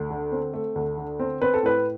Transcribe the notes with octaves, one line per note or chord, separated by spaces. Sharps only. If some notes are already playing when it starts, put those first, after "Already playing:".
Already playing: D2
D3
C4
A3
D2
D3
C4
C4 B4
A4
A2 B4